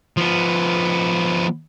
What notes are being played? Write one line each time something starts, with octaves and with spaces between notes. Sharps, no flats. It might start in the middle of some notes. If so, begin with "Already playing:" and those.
F3 B3